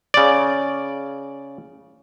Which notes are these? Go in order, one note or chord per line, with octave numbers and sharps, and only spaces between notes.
C#3 D5